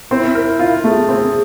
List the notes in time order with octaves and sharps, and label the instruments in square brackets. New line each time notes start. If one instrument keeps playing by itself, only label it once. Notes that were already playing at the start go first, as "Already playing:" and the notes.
[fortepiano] C4 [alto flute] E4
[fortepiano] A#4
F4
[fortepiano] A3 [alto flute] G#4
[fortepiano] C4